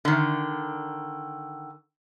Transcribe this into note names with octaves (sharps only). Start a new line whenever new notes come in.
D3 D#3